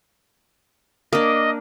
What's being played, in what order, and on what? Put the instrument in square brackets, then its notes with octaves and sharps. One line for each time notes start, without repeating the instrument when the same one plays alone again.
[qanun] A#3 D4 [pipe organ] D#5